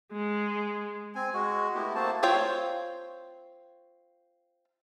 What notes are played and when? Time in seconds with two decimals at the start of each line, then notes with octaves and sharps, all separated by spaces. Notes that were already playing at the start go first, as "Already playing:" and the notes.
0.12 G#3
1.15 C4 G#5
1.34 G#3 F#4
1.75 A3 B3 E4 G4
1.95 A3 A#3 C4 F#4 C5 A5
2.23 C4 F4 C5 C#5 G5